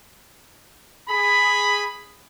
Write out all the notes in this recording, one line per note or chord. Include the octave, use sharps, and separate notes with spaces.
G#4 B5